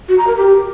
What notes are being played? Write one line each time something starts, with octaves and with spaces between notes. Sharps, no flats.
F#4
A#5
A#4
G4